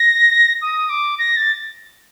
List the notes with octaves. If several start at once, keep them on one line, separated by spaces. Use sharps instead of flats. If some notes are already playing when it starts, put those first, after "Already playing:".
Already playing: A#6
D#6
D6
A#6
A6